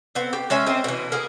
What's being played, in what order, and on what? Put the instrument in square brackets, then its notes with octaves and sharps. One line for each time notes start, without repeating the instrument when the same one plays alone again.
[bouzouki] B3 C4
G4
G#3 C#4 E5 G#5
C4 A#4 C5 D#5
B2 E3
A#3 E4 G#4